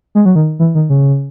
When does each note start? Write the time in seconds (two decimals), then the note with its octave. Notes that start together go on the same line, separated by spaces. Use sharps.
0.15 G#3
0.25 F#3
0.35 D#3
0.59 E3
0.75 D#3
0.90 C#3